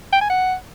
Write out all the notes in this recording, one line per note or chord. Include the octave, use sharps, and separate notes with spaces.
G5
G#5
F#5